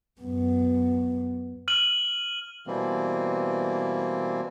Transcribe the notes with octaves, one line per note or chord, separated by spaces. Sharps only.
F#2 B3
F6 D#7 F#7
B2 E3 G3 A#3 C4